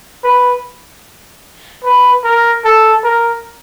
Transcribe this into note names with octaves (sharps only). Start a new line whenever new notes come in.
B4
B4
A#4
A4
A#4